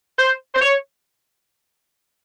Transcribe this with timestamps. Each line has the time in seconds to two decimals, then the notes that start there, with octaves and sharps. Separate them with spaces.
0.19 C5
0.55 C5
0.61 C#5